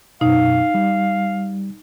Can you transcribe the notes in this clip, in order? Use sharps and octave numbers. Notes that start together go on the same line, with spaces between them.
F#2 B2 D#4 F5
G3